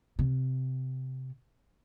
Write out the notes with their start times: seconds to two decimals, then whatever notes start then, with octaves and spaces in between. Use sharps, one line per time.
0.19 C3